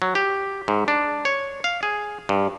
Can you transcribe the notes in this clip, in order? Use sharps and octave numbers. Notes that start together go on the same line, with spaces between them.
F#3
G4
G#2
D4
C#5
F5
G#4
G2